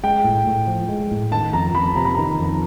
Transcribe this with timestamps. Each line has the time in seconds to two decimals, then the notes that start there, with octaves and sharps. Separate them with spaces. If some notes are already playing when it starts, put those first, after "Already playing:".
0.04 G#3 G5
0.24 A2
0.47 A2
0.67 F3
0.89 G#3
1.11 A2
1.32 D#3 A5
1.53 F2 A#5
1.74 F2 B5
1.95 C3 A#5
2.05 B5
2.15 D#3 A#5
2.39 F2